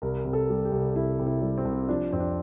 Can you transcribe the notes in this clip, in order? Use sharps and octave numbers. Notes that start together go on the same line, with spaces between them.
C2 A#4
C3
A4
G3
G4
C2
C2 E4
C3
E4
G3
C4
C2
F3 D4
F2 C4
D4